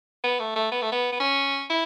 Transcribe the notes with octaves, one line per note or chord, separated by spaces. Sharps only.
B3
A3
A3
B3
A3
B3
B3
C#4
E4